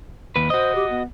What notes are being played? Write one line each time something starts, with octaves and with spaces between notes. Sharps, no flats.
D#2 B4
F#4 C5 D#5
G4
B3